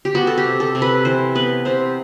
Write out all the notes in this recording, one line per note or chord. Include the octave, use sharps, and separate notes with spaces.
G4
B3 F#4
A4
G4
C3
A4
C3
B4
E3 C5
B3 B4
C3 C5